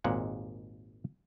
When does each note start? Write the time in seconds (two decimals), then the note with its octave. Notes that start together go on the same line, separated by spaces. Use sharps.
0.04 G#1 D#2 A#2 G#3 F#5